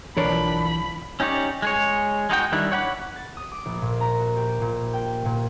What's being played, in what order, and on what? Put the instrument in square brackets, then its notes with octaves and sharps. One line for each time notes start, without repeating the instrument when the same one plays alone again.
[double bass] B1 F3 [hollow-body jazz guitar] E3 C#5 [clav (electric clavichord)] D4 A#4 [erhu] B5
[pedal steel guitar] C#4 D#4 G4 C#5 D5
G#3 G#4 C#5
G#3 D#4 F#4 G5
D#3 G3 D4 E4
C#5 F#5 B5 D6
[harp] A6
D#6
D6
A#1
A#2
A#5
F#4
G4
A#2
G5
A#2